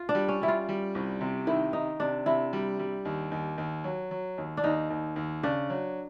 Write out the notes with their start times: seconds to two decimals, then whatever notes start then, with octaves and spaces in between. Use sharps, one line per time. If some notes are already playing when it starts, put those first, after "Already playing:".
Already playing: F4
0.09 D4
0.15 G3
0.29 C#4
0.42 G3 E4
0.48 F4
0.69 G3
0.95 C2
1.21 C3
1.47 D#3 E4
1.73 D#3 D#4
2.00 C3 D4
2.26 C3 E4
2.53 G3
2.79 G3
3.05 D#2
3.31 D#2
3.58 D#2
3.84 F#3
4.11 F#3
4.38 D#2
4.57 D4
4.64 D#2 D#4
4.90 D#2
5.16 D#2
5.43 C#3 D4
5.70 F#3